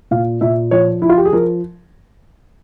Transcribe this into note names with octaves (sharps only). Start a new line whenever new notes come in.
A#2 F5
A#2 E5
F3 C#5
F3 E4
F4
G4
G#4
F3 A#4